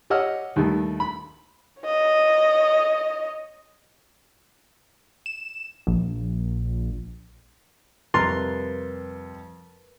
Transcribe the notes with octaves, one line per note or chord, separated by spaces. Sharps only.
G4 C#5 D#5 F#5 E6 F6
D#2 D#3 G3 A3
B5
C#5 D#5
E7
A#1
F2 C3 G3 A#4 B4 A#5 C6 A6